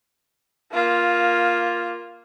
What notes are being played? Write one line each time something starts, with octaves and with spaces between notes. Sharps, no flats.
A#3 F4